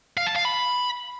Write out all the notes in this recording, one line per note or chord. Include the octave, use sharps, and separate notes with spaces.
F5
A5
F5
B5